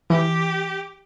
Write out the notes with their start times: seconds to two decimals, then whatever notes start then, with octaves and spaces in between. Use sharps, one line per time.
0.10 E3 G4